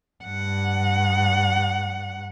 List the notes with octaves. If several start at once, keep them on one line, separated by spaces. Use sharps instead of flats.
G2 F#5